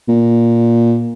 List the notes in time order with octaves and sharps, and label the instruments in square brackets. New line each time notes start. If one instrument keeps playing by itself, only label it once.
[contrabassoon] A#2